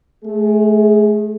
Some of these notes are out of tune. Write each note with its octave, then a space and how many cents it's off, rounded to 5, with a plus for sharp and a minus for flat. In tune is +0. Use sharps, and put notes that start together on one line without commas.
A3 -30 G#4 +0